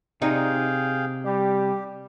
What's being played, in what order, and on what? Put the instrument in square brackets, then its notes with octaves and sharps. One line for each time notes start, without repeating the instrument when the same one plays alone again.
[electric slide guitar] C3 [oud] D#4 [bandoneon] G#4 F5 G5
[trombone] G3 [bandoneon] G4